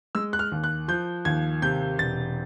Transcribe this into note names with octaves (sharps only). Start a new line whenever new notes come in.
G#3 E6
F#6
F6
D#2
F#6
F3 G6
D#2 G#6
C3 G6
E1 A6